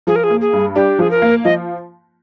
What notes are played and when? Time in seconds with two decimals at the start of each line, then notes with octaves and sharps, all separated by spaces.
0.07 F3 G#4
0.16 A#4
0.24 G#4
0.30 A#3
0.41 G#4
0.53 G2
0.75 D4 G4
0.99 F3 G#4
1.11 A#4
1.22 A#3
1.44 F3 D#5